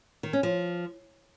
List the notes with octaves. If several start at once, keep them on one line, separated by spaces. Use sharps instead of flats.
D#3
C#4
F3